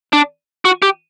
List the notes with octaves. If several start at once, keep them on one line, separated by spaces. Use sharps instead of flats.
D4
F#4
G4